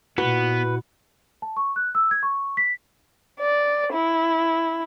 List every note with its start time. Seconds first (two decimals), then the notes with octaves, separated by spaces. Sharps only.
0.18 A#2 B3 E4 F#4 B4 F#5
1.42 A5
1.57 C#6
1.76 F#6
1.95 E6
2.11 G#6
2.23 C#6
2.57 B6
3.40 D5
3.93 E4